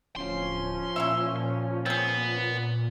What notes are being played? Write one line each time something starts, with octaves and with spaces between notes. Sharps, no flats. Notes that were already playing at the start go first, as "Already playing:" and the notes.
D1 F3 C#4 C6
A#2 E4 C#5 E5
B3 C4 G#4